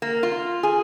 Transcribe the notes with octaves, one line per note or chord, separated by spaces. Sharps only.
A#3
F4
G#4